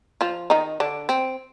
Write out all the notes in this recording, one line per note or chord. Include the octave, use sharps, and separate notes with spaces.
F3 F4
D#3 D#4
D3 D4
C4